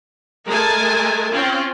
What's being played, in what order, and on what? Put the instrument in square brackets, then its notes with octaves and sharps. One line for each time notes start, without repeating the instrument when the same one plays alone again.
[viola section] G#3 A3 A#4 G#5 A5
C4 C#4 F4